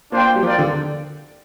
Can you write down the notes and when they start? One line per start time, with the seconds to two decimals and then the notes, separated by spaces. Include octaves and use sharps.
0.12 A#3 D4 F4 C5 G5
0.36 G3
0.43 F3 D4 F4 A#4 D5 G5
0.59 D3